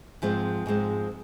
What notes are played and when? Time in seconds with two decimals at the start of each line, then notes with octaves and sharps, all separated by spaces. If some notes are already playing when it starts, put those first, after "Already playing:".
0.22 G#2 F3 G#3 C4
0.66 G#2 F3 G#3 C4